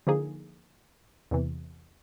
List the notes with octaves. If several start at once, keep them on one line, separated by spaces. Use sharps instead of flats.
D3 F3 A#3 D#4 G#4
E2 C3 E3